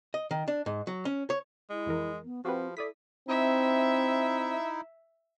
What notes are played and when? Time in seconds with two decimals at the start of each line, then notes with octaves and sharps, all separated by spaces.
0.14 D#5
0.31 D#3
0.48 D4
0.66 G#2
0.87 F#3
1.05 C#4
1.30 C#5
1.70 G#3 E4
1.86 F2 E3 A#4
2.25 B3
2.45 F3 C4 F#4 G4 B4
2.77 E4 A4 D5 D#6 B6
3.28 C4 D#4 E4 E5